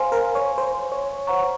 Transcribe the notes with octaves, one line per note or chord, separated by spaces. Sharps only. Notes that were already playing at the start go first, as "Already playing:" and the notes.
Already playing: C5 F5 G#5 C6
A#4
C#5
C5
C#5
C5 F#5 A#5 C#6